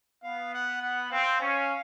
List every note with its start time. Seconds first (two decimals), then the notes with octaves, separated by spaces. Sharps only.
0.23 B3 F5
0.53 F#5
0.82 F#5
1.11 C4 F5
1.40 C#4